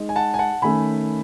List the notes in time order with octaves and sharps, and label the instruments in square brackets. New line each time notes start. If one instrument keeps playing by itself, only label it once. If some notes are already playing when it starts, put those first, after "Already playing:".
Already playing: [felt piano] G#3 D#4 G#4 D#5
[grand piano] G#5
F#5 A5
G#5
F#5 A5
[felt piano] D#3 A3 C#4 [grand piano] G#5 B5